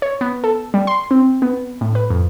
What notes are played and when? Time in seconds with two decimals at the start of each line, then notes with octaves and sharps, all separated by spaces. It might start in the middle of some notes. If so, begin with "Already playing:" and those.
0.02 C#5
0.21 B3
0.44 A4
0.74 G3
0.87 C6
1.11 C4
1.42 B3
1.81 A2
1.95 B4
2.10 F2